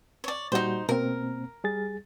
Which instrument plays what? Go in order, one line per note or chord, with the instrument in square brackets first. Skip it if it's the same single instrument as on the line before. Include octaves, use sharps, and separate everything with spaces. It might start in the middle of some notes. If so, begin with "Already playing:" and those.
[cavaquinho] C#5 D5
[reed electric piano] A#2 G3 F#4 [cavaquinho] D#4 C5
[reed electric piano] B2 A#3 C4 [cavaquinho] A#4
[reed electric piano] G3 G#4 A6